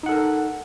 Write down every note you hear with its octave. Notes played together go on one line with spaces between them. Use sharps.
D#4 A4 A#4 F#5